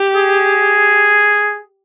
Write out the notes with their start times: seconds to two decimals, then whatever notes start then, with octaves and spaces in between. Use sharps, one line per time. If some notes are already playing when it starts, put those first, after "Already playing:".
Already playing: G4
0.15 G#4